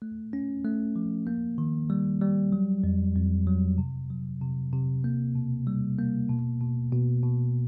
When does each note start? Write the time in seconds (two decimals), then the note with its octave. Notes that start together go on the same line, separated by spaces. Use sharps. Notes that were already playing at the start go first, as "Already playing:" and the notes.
0.02 A3
0.33 C#4
0.64 A3
0.96 F3
1.27 A#3
1.58 D#3
1.90 G3
2.21 G3
2.52 F#3
2.84 F2
3.15 F2
3.47 F#3
3.78 C3
4.10 F#3
4.42 C3
4.73 C3
5.04 A#3
5.35 B2
5.67 G3
5.98 A#3
6.30 B2
6.61 B2
6.92 B2
7.23 B2